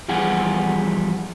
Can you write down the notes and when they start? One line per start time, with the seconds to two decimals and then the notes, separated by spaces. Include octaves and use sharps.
0.08 E2 F3 G3 G#4 F#5